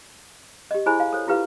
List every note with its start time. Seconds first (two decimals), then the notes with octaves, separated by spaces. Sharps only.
0.71 G4 D#5
0.86 E4 G#4 C5 G#5 B5
1.00 F5
1.13 A4 C5 C#5
1.27 E4 F4 G4 B4 F5